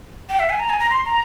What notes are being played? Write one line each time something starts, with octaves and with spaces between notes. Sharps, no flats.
G5
E5
G#5
A#5
G#5
A#5
C6
A#5